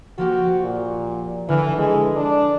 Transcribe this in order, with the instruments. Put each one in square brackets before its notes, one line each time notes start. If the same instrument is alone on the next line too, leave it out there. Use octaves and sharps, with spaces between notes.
[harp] F3 A#3 G4 [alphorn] F#4
[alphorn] A#2
[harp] D3 F6 [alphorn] E3
[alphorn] G#3
D4